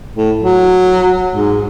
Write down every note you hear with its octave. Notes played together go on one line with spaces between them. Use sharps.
A2
F#3
G#2